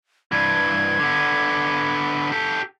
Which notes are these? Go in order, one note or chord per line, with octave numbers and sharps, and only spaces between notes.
G2 E3 G#6
D3 B3
G4 A4